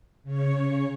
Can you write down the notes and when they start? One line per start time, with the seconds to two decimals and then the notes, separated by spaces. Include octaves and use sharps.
0.24 C#3 C#5